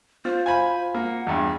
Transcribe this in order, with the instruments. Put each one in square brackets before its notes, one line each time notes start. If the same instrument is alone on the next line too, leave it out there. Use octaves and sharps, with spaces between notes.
[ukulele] F4 [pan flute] C5
[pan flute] C5 [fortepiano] G#5 B5
[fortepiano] A#3 [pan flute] F#5
[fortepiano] E2 G2